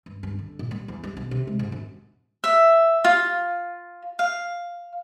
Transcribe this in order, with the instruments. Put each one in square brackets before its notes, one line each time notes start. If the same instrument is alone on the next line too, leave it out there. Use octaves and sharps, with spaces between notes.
[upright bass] G2
G2
D3
A#2
G3
E2
G3
B1
C3
G#3
G#2
F#2
[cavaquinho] E5
F4
F5